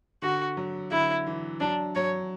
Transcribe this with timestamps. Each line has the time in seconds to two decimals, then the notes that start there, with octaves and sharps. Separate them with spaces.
0.22 D3 F#4
0.57 F#3
0.91 D3 E4
1.26 E3
1.60 F#3 D4
1.95 F#3 C#5